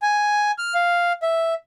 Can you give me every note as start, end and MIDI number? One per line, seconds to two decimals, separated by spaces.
0.02 0.51 80
0.58 0.74 89
0.74 1.13 77
1.23 1.54 76